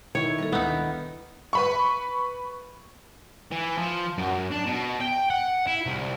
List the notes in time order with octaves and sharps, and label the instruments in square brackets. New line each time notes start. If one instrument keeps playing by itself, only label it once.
[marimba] B2 [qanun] D#3 E4 [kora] C#5
[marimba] G3 A#3 A4 [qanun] B4
[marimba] D2 E6 [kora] B3 D#4 [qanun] A#4
[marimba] D#3 D4
[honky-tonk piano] B4 B5 C#6
[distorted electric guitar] E3
F3
F#2
D4
B2
G5
F#5
E4
C2